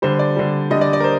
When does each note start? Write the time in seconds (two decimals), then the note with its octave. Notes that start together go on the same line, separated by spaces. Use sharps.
0.02 D3 G3 C5
0.19 D5
0.36 D3 G3
0.70 D3 G3 D#5
0.81 D5
0.93 D5
1.00 A#4
1.04 C5